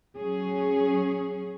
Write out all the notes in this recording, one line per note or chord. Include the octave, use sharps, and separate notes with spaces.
F#3 C#4 G#4